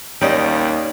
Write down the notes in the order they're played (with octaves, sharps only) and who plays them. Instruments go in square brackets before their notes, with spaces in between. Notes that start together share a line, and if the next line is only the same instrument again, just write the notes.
[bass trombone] D#2 [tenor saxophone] G3 [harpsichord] C#4 [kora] D#4